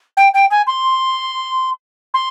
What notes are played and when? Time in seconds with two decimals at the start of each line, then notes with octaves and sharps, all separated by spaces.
0.17 G5
0.34 G5
0.51 G#5
0.67 C6
2.14 C6